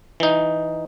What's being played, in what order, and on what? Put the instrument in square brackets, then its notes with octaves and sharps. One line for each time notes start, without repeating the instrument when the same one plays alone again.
[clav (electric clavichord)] E3 D#4